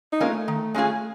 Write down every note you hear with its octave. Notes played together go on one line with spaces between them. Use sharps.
D#4
G#3 A#3 C#4 F4 A#4
A3
D#3
G#3 C#4 F4 G#4